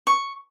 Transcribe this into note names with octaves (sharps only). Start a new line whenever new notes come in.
C#6